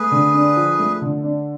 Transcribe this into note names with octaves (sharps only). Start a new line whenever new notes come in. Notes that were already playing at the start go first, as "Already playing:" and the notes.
Already playing: A3 G#4 B4
D3
D4
F3
A3
D3
D4